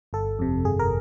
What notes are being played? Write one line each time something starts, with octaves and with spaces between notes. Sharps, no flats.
G1 A4
F2 C3
G1 G#4
A#4